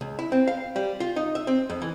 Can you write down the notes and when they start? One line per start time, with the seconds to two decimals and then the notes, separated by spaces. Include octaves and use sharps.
0.01 C#2
0.19 E4
0.32 C4
0.47 F5
0.76 G3
1.00 F4
1.16 D#4
1.35 E5
1.47 C4
1.70 F2
1.82 E3